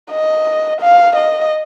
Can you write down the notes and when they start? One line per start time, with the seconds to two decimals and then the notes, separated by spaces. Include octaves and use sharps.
0.11 D#5
0.81 F5
1.16 D#5